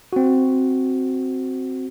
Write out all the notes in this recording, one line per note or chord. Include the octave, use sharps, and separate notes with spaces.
C4 F#4